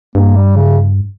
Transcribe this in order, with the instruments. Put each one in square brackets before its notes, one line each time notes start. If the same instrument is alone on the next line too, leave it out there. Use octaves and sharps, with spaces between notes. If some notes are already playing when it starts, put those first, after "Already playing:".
[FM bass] G2 [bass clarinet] A#3
[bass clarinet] G3
C#3